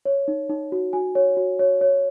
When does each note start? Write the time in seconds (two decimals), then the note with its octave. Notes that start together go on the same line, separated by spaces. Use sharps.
0.05 C#5
0.28 D#4
0.50 D#4
0.72 F#4
0.93 F#4 G#5
1.15 C#5
1.37 F#4
1.59 C#5
1.81 C#5